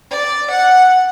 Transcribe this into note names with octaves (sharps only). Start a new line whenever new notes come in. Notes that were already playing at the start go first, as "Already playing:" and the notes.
D5
F#5